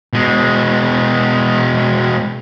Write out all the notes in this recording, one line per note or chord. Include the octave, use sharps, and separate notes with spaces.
B2 G#3